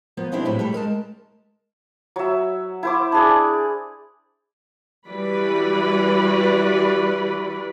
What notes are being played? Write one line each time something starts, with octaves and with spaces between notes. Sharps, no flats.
F3 A#3 B3
B2 C4 D4 E4 G4
A2 F3 F#3 G4 B4
G3 A3 G4
G#3 A#4 G#5 A5
F#3 E5
E4 C5 D6
D4 G#4 D5
E3 G3 F#4 B4 D5 B5